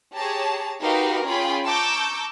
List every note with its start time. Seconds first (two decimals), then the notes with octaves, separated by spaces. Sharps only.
0.15 G4 G#4 C#5 A5 A#5
0.81 D#4 F#4 G4 A#4 B4 F5
1.25 C#4 F4 G#4 G5 B5
1.64 A5 A#5 C#6 D6 E6 G6